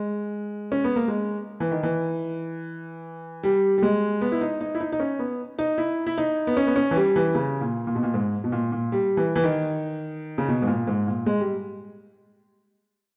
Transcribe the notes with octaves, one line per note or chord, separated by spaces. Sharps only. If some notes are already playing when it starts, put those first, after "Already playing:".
Already playing: G#3
C#4
B3
A#3
G#3
E3
D#3
E3
G3
G3
G#3
B3
E4
D#4
D#4
E4
D#4
D#4
C#4
B3
D#4
E4
E4
D#4
B3
C#4
B3
C#4
E3
G3
E3
C#3
A#2
A#2
B2
A#2
G#2
B2
A#2
A#2
G3
E3
E3
D#3
C#3
B2
G#2
A#2
G#2
A#2
G#3
G3